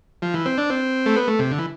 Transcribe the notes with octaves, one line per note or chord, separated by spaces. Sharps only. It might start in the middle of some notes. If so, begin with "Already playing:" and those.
F3
E3
C4
D4
C4
A3
B3
A3
C3
D3
E3